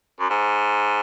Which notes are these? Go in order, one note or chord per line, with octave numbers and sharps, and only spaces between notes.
F#2
G#2